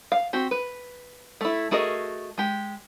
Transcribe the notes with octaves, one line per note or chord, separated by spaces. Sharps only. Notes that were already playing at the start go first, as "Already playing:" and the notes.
F5
C4 F#4 G4
B4
A3 E4
A3 F#4 G#4 A#4 D#5
G#3 G4